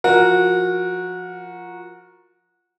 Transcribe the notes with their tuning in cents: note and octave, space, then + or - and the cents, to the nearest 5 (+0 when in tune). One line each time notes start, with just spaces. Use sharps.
F3 +0 F#4 -20 A#4 +5